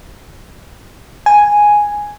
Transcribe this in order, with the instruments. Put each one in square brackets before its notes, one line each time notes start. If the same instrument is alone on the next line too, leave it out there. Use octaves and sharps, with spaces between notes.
[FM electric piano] G#5